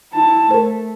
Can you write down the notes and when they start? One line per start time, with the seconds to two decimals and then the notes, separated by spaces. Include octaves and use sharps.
0.14 E4 A5
0.51 A3 A#4 C5